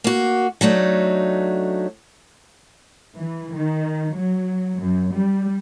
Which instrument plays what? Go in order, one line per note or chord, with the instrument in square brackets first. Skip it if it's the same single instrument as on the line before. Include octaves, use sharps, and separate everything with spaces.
[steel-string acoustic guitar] A#3 F#4
F#3 A3 D4 D#4
[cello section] E3
D#3
F#3
F#2
G3